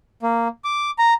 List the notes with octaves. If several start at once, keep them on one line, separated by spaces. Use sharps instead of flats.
A#3
D6
A#5